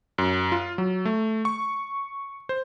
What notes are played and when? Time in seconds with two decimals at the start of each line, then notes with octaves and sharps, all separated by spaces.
0.18 F#2
0.52 F4
0.78 F#3
1.05 A3
1.45 C#6
2.49 C5